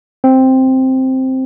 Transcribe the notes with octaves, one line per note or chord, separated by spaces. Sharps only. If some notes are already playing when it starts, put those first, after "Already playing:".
C4